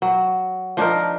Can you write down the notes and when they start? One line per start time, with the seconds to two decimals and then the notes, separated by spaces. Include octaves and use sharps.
0.02 F#3
0.77 F3 D4 D#4 A#4